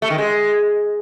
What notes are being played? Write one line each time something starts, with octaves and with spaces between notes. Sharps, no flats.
A3
D#3
G#3